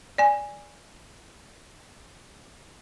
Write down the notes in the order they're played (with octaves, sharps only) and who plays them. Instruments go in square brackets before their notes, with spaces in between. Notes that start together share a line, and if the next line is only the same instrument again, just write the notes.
[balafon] D5 G#5